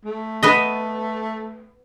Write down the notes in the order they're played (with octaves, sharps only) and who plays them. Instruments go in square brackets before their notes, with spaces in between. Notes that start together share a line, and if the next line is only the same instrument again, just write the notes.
[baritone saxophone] A3
[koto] B3 B4 D#5